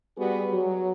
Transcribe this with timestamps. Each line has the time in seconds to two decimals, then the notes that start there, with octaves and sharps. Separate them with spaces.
0.17 G3 B3 F#4 G#4
0.51 F#3